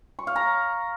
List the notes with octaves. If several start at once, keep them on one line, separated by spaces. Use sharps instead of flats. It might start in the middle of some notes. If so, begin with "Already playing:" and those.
C#6
F5
A#5